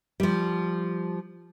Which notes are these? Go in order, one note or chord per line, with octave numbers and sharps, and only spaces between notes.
F3 G3